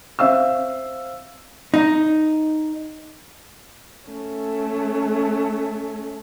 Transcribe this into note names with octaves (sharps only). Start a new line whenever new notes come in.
C4 E5 F5 E6
D#4
A3 C#4